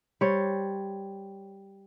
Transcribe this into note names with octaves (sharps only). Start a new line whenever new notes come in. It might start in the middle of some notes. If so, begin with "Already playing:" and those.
G3 C5 C#5